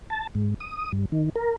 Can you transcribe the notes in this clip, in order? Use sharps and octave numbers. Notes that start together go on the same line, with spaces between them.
A5
G#2
D#6
G2
D#3
A#4